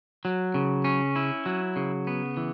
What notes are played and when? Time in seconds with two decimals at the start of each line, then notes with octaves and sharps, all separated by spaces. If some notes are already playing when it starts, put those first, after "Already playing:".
0.25 F#3
0.54 C#3
0.84 C#4
1.16 E4
1.46 F#3
1.76 C#3
2.07 B3
2.37 E3